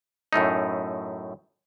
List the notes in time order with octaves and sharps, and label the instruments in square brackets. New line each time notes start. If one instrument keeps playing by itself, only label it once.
[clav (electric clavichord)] F#2 A2 A3 D#4